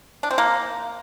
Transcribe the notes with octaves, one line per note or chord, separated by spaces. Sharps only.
D4
C4
A#3